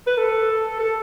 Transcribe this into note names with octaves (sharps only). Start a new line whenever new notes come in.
B4
A4
A4